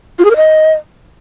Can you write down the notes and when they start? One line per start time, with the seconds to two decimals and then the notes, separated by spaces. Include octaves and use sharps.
0.19 F4
0.25 G#4
0.30 A#4
0.36 D#5